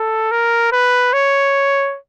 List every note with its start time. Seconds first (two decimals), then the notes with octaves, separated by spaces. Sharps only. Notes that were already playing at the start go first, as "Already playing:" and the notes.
Already playing: A4
0.31 A#4
0.72 B4
1.13 C#5